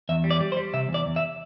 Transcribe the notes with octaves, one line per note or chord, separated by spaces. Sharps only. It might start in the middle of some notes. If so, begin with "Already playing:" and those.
E2 E5
G3
D5
G3
C5
G3
C3 E5
E2
D5
E2
E5